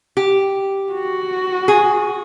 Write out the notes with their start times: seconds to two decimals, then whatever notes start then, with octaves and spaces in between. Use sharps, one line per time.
0.17 G4
0.92 F#4
1.68 G#4